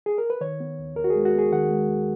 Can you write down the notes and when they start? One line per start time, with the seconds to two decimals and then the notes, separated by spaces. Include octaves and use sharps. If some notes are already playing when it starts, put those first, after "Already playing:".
0.06 G#4
0.18 A#4
0.30 B4
0.41 D#3 C#5
0.60 B3
0.79 D#2
0.96 D#2 A#4
1.04 F#4
1.10 G#4
1.16 G#3
1.25 F#4
1.34 B3 G#4
1.52 D#3 F#5
1.71 G#3
1.89 D#2